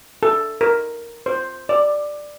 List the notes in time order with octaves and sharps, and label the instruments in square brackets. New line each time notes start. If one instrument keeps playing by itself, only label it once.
[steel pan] A4
A#4
C5
D5